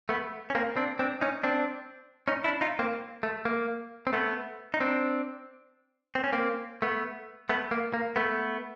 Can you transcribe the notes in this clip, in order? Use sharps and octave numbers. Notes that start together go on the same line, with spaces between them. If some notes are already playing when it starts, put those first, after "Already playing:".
A3 B3
C#4
A#3 C4
C4 D4
C4 D4
C#4 D#4
C4 D4
C#4 D#4
D4 E4
D#4 F4
A#3 C4
A3
A#3
C4
A3 B3
D#4
C4 D4
C4
C#4
A#3 C4
A3 B3
A3 B3
A#3
A#3
A3 B3